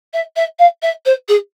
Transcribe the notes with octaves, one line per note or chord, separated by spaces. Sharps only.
E5
E5
F5
E5
C5
G#4